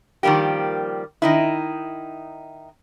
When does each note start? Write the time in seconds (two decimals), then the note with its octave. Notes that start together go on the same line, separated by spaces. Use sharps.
0.23 D#3 F3 G3 A#3 G4
1.22 D#3 D#4 E4